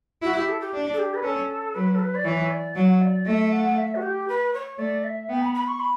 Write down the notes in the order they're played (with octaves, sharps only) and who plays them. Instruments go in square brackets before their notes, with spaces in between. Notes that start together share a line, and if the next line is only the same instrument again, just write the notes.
[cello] E4 [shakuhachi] F#4
[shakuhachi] G4
A4
G4
[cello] D4
[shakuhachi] A4
G4
B4
[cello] C#4 [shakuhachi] A4
[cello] F#3 [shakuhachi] B4
[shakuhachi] A4
B4
D5
[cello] E3 [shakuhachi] C#5
[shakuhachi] D5
[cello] F#3 [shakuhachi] F#5
[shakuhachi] D5
[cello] A3 [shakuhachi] E5
[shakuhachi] F#5
E5
F#4
G4
B4
C#5
[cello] A3 [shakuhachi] D5
[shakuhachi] E5
[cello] B3 [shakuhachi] G5
[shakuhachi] B5
B5
C#6
B5